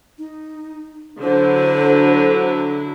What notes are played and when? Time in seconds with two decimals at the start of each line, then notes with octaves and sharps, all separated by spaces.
0.18 D#4
1.21 D3 F#3 E4 C5